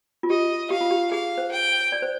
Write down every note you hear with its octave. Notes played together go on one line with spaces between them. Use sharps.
F4
G4 D#5
G4 F5
F4
G4
G#4 F5
C5
G5
D5
C5